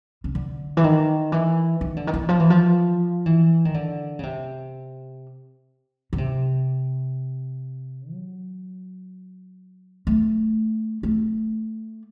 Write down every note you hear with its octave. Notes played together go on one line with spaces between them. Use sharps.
C#3
D3
E3
D#3
E3
D#3
D3
D#3
E3
F3
E3
F3
E3
D#3
D3
C#3
C3
C#3
C3
F#3
A3
A3